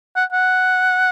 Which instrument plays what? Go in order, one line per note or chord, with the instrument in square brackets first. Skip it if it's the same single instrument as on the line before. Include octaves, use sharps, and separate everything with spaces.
[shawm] F#5
F#5